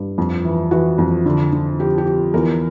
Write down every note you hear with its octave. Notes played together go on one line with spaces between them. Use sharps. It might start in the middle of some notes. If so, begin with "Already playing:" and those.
Already playing: G2
F2
E3
E3 F#4
F2
D3
D3
F3 G4
G4
F3
E2 A#4